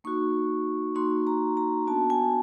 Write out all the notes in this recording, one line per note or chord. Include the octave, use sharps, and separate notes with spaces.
A#3 D#4 F#4 C#6
A#3 D#4 F#4 C6
A#5
A#5
B3 D4 F#4 A5
G#5